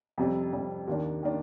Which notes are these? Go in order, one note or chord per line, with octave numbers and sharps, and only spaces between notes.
F2 C3 G3
F2 C3 G3
D#2 D#3 A#3 D4
D#3 A#3 D4